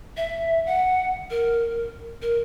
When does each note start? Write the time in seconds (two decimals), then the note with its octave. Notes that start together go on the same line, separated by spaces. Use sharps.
0.17 E5
0.66 F#5
1.30 A#4
2.22 A#4